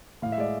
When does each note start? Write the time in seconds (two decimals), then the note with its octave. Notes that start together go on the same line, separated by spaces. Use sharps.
0.22 A2 F5
0.32 E5
0.38 G#3 D5